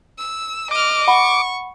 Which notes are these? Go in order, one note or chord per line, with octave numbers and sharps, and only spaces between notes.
E6
D#5 D6 F6
F#5 B5 C#6